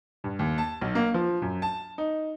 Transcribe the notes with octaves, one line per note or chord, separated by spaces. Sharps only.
G2
D#2
A5
B1
A#3
F3
F#2
A5
D#4